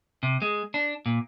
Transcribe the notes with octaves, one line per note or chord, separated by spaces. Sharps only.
C3
G#3
D4
A#2